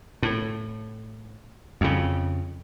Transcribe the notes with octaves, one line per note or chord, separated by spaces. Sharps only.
A2
F2 C#3